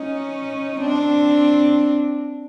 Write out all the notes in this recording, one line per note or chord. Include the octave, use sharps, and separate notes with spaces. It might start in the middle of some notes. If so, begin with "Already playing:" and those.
Already playing: C#4 D#4
C4 D4